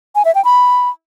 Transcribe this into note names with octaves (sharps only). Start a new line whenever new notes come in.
G#5
E5
G5
B5